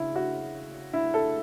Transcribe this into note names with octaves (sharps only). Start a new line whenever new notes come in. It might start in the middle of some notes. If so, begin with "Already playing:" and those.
Already playing: C#3 E4
F#4
E4
A4